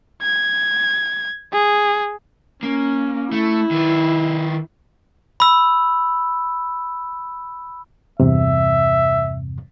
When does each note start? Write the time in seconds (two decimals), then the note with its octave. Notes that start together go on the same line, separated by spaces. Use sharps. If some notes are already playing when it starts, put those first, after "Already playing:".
0.22 G#6
1.53 G#4
2.63 A#3 C#4
3.32 A3 E4
3.71 D#3 B4
5.40 B5 E6
8.20 E2 G2 C3 E5